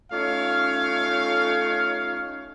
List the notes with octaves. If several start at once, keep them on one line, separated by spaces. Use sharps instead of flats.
A3 C#4 D#4 F4 C#5 F5